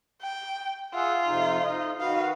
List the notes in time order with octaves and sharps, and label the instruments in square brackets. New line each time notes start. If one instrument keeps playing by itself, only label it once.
[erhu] G5
[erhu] F4 [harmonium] G#4 E5 F#5
[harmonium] F2 C3 D#4
D#4 D#5
[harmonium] D#3 F#4 B4 [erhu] F5